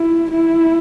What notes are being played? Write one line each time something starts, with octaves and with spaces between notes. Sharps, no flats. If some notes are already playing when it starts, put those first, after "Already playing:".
Already playing: E4
E4